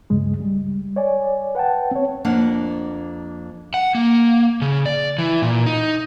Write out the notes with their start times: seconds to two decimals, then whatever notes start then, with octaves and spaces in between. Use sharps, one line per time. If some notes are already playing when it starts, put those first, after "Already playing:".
0.10 C#2 G2 C#3 G#3
0.40 G3
0.96 C#5 D5 G#5
1.55 B4 F#5 G5 A5
1.91 C4 C#5
2.25 F2 F3 A#3 D4 F#5
3.74 F#5
3.95 A#3
4.62 C#3
4.86 D5
5.18 E3
5.42 A#2
5.66 D#4